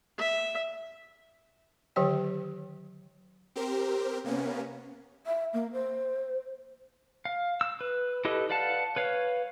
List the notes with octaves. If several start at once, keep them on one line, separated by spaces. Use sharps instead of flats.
E5
D3 D#3 F#3 G4 C#5 G5
C4 G4 A#4 C5
C3 A#3 B3 C#4
E5
A#3
C5
F5
E6
B4
E4 G4 A4 B4 D#5
B4 D5 F5 F#5 A5
B4 C#5 F5